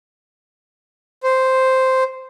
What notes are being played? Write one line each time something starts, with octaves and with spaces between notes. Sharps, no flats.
C5